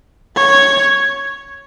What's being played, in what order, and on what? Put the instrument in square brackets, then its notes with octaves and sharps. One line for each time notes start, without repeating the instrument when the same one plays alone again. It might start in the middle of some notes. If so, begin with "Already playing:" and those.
[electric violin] C#5